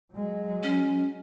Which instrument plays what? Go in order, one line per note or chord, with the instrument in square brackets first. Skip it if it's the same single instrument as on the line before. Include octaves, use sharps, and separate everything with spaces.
[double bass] F#3 G#3
[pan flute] C#4